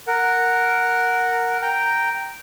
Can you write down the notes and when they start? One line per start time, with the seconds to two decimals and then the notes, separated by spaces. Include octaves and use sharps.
0.07 A#4 F#5
1.62 G5 A#5